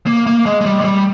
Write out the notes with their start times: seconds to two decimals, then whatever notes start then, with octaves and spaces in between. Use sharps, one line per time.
0.07 A#3
0.26 A#3
0.46 G#3
0.61 G#3
0.66 G3
0.81 G#3
0.85 G3